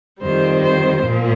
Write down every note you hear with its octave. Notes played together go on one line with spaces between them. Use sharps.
F2 D#3 G3 C5
C5
A#2 F3 A#3